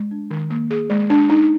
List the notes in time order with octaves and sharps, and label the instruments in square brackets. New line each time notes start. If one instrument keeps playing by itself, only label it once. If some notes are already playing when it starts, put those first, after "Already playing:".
Already playing: [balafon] G#3
D4
D#3
A#3
G#4
G#3
D4
D#4